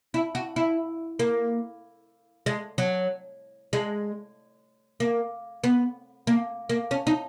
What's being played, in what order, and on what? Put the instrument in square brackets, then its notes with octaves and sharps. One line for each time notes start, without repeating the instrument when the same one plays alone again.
[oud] E4
F#4
E4
A#3
G#3
F#3
G#3
A#3
B3
A#3
A#3
C#4
D#4